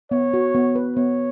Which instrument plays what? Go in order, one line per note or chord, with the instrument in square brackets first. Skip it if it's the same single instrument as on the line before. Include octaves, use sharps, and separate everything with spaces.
[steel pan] B3 [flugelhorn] C#5
[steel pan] F#4
B3
B4
[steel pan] B3 [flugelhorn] C#5